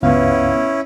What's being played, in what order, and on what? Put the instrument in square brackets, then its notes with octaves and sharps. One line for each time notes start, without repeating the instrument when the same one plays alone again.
[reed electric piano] C#2 G2 F5 [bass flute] B3 [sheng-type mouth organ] C#4 E4